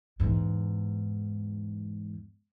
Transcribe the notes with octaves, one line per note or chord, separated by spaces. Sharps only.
E2 G#2